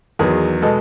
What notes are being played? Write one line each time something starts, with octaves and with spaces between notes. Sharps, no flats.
E2 D#3 F#3 B3 G#4
B2 G#3 B3 A4